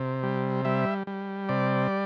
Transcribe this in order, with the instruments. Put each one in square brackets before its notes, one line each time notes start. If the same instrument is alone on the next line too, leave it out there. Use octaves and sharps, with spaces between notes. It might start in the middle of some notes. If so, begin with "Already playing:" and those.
Already playing: [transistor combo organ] C3
G3
G3 E5
G3
C3 D5